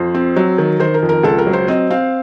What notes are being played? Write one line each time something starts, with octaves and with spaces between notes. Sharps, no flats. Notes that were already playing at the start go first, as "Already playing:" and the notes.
Already playing: F2 C5
C4
F#3
D#3
D#3 C5
A#4
F2
A#4
C#2 A4
A#4
F#3
C5
C4 D#5
C4 F5